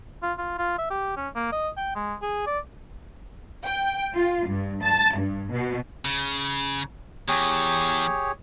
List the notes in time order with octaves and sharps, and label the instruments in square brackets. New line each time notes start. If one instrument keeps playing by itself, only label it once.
[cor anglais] F4
F4
F4
E5
G4
C#4
A#3
D#5
G5
G#3
G#4
D5
[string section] G5
F4
G2
A5
G2
B2
[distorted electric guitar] C#3
[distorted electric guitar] E2 [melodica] G4 G#4 C#5